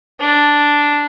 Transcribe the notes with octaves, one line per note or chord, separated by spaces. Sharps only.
D4